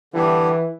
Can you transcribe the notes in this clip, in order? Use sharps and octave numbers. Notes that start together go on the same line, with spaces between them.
D3 E3 G3 B3 E4 G4